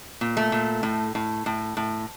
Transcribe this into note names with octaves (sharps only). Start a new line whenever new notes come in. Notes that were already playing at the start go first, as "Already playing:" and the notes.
A#2
A3
A#2
A2
A2
A2
A2